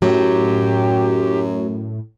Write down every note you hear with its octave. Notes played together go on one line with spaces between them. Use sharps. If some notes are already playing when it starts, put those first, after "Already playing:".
F#2 A2 F#3 G4